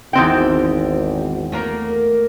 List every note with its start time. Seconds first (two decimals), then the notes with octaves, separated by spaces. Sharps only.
0.13 G#1 E2 C4 G5
1.52 A3 A#3 A#4